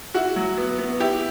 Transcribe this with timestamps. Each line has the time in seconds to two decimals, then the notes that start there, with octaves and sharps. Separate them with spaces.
0.14 E4 F#4
0.36 F#3
0.57 B3
0.78 B3
1.00 E4 G4